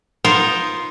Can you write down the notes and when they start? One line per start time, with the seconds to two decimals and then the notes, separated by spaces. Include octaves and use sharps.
0.25 B3 D#4 F4 A#4 C5